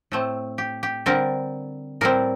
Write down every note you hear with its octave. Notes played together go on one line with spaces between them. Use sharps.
A2 A3 C4
G4
G4
D3 G3 C4 A#4
A2 G3 C4 A#4